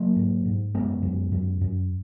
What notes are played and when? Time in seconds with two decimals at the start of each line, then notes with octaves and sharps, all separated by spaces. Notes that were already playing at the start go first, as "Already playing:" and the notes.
Already playing: F#3 A#3
0.16 G#2
0.45 G#2
0.74 F#2 G#3 B3
1.02 F#2
1.32 F#2
1.61 F#2